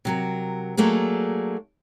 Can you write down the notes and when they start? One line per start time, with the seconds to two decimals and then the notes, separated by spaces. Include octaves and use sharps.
0.05 C3 F#3 A#4
0.77 F#3 A3 A#3 D4 G#4